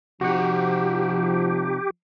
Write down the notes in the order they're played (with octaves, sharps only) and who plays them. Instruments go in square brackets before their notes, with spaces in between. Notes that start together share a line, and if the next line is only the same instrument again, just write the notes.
[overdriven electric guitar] C3 D#4 [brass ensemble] F3 [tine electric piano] F#4 F#5 [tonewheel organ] G4